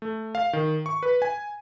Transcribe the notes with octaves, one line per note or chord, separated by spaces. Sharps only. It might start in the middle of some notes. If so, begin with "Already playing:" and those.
A3
F5
D#3
C#6
B4
G#5